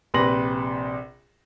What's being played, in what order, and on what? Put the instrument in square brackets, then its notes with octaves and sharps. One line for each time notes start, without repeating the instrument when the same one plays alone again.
[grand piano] A#1 C3 B4 C6 A#6 F#7